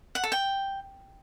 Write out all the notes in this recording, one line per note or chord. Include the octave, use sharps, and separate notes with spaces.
F#5
A4
G5